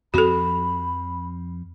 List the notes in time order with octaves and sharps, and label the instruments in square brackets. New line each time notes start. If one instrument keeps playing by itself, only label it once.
[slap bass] F2 F3 C4 [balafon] F#4 A4 [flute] B5